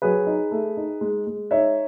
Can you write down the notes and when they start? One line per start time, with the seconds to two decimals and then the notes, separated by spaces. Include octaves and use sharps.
0.02 F#3 G#4 B4
0.27 D#4
0.51 A3
0.77 D#4
1.01 G#3
1.27 G#3
1.51 D#4 C#5 E5